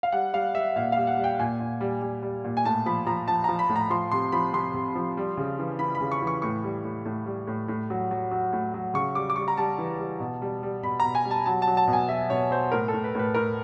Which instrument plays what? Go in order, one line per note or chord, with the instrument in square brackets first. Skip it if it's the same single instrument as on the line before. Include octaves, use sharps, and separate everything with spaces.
[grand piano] F5
G3 F#5
G3 F5
G3 E5
A#2 F5
G3 F5
F#5
G3
G5
A#2 G#5
A#2
G3
G3
G3
A#2
G#5
A2 A5
F3 B5
F3 A#5
F3 A5
F3 A#5
B5
A2
A#5
F3 C6
C3 C6
F3 B5
C3 C6
C3
F3
G3
C#3
E3
E3 B5
B5
C#3
C#6
E3 C#6
A2 C#6
G3
A2
A2
G3
A2
A2
F#3
F#3
F#3
A2
F#3
C#3 C#6
G3 D6
D6
G3 C#6
A#5
G3 A5
E3
G3
B2
G3
G3
B2 B5
B2 A#5
G#5
G3
A5
F#3 A5
A5
F#3
A5
B2
G#5
F#3 E5
B2 C#5
F#3 C5
A2 A#4
A2 A4
B4
A2 B4
A2 A#4